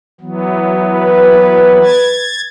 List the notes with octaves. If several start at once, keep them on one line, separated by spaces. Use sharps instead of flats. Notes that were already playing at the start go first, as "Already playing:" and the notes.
E3 F#3 B3
B4
G#6 A6